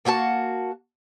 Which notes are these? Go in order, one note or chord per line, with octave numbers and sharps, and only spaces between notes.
A#3 F#4 G4 A5